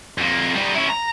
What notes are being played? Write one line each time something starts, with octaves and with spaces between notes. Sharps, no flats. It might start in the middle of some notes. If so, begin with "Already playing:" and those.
F2 A#3
G3 D#4
C#4 E4
A#5